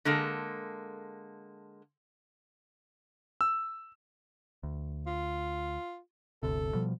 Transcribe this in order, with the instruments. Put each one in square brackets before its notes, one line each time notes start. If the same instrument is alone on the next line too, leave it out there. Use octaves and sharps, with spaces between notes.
[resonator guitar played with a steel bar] D3 G#3 A#3 A4
[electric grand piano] E6
[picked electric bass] D2
[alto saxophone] F4
[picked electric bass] G1 D2 C3 [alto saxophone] A4
[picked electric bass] B2 F3 G3